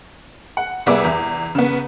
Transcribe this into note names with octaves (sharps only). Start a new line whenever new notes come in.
F#5
C2 G3 B3 G#4 E5 D6
E2
C#3 B3